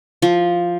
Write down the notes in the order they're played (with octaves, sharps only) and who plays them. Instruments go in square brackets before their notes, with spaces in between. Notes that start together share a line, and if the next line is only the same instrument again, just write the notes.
[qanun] F3